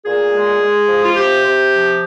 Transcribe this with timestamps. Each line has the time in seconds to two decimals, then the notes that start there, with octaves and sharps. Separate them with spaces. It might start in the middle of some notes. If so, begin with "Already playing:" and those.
0.05 A#2 G#4
0.32 G#3
0.60 G#3
0.88 F3
1.04 F4
1.16 C3 G4
1.43 C3
1.72 F3